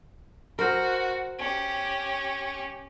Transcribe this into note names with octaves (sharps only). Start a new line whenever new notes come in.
F#4 A#4 C5
C#4 G4